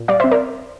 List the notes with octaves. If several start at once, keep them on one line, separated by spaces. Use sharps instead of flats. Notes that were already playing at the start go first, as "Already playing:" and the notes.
Already playing: A#2
G3 D5 F5
C4 C5 E5
A#4 D5